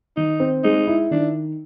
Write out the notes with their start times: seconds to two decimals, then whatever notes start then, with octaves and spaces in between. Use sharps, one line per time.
0.17 D#3 D#4
0.40 C4
0.64 G#3 D#4
0.87 E4
1.11 D#3 D4